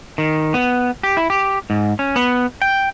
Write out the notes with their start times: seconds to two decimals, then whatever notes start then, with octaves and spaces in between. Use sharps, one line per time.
0.18 D#3
0.54 B3
1.03 G4
1.17 E4
1.30 G4
1.70 G#2
1.99 C#4
2.16 B3
2.62 G5